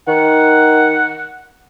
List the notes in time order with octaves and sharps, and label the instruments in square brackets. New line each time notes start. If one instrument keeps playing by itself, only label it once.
[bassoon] D#3 [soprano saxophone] F#5